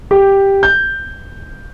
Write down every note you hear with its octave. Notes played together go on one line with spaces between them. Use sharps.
G4
G6